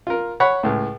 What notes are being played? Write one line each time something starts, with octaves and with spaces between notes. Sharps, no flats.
F4 A#4
C#5 F#5 B5
C#2 A2